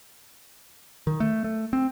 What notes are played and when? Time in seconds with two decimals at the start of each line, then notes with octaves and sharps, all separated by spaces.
1.07 D#3
1.20 A3
1.44 A3
1.73 C4